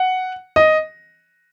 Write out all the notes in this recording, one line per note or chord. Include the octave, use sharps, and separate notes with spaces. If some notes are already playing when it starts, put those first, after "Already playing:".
Already playing: F#5
D#5